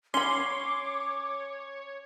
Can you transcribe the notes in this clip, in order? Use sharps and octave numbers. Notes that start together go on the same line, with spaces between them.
C#4 C#5 B5 C6 D6